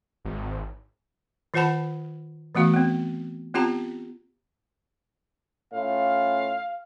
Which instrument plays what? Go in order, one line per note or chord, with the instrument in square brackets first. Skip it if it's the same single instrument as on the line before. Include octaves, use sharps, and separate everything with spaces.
[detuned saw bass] G#1
[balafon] D#3 F4 C5 F#5 A5 B5
E3 A3 B3 F#4 F5
B3 C4
B3 C4 F4 G4 A5 A#5
[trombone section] A2 C#4 F4 [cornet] F5